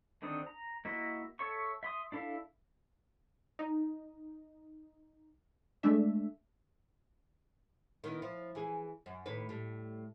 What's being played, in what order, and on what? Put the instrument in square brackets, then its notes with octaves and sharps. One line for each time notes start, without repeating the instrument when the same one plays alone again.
[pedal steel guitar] D3 D#3 C4 D4 D#6
A#5
A#3 E4 F#4 D#5 E5
A4 C#5 E5 C#6
E5 C6 D#6
D4 E4 A4 E5 F5
[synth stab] D#4
G#3 A3 D4 E5
[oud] D#3 B3 E4
F3
E3 G#4
F#2
D#2 A2 B4
A2 G3